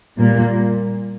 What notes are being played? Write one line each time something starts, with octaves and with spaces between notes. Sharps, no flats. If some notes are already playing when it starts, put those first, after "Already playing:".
A#2 G3 A#3